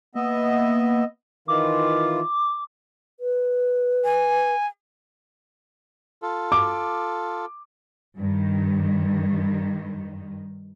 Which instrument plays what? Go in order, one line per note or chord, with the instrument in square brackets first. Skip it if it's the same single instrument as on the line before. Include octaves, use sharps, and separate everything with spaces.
[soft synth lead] A#3 [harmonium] B3 D#5 E5
[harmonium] D#3 E3 F4 [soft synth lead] D6
[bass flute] B4
[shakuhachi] G#5
[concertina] F4 A4
[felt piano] D6
[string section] G2 D#3